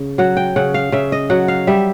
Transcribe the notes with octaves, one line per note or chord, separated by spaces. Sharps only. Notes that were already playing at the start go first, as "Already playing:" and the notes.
Already playing: C#3
F#3 F#5
G5
C#3 F#5
F5
C#3 E5
D#5
F#3 F#5
F5
G3 E5